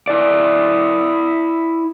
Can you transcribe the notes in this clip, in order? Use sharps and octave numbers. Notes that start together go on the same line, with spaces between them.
E4 D5